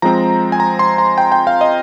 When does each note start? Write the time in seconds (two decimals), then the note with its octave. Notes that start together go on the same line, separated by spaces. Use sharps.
0.02 F3 G#3 C4 A#5
0.52 G#5
0.60 A#5
0.79 C6
0.98 A#5
1.18 G5
1.32 G5
1.47 F5
1.61 D#5